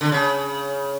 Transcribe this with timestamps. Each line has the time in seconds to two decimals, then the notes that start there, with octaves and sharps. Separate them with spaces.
0.01 D3
0.12 C#3